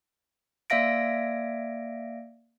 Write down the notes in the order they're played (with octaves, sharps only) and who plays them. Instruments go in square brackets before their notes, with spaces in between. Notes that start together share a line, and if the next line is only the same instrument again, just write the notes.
[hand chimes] A#3 D5 E5 F5 A#6 D7